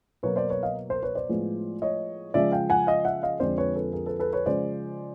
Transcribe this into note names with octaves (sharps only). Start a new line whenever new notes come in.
B2 F#3 A#3 B4 C#5
C5 D5
B4 C#5
D#5 F5
A#4 C5
B4 C#5
C5 D5
A2 F3 G#3 B3
C#5 D#5
C#3 F3 G#3 D5 E5
F5 G5
F#5 G#5
D#5 F5
E5 F#5
D#5 F5
F2 D3 F3 G#3 C4 C5 D5
B4 C#5
A4 B4
G#4 A#4
A4 B4
A4 B4
B4 C#5
C#3 F3 G#3 C5 D5